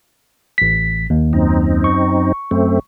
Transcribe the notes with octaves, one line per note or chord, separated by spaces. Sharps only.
A1 B6
D#2
F#2 C4 D#4
C#6
F#2 A3 C4